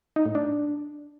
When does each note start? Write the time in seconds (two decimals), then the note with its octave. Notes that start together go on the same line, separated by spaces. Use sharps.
0.16 D#4
0.26 A2
0.35 D4